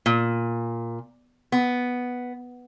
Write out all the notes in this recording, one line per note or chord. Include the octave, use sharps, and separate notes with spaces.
A#2
B3